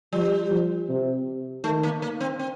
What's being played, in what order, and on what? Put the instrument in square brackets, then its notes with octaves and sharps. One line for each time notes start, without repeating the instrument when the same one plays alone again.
[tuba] F3 [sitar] G3
[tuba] F3
C3
[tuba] D#3 [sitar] A3
[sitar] A#3
A#3
C4
C4